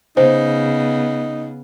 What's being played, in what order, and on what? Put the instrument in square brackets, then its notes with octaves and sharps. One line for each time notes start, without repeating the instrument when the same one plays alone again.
[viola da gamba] C#3 B3 [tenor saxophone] D#4 [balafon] C5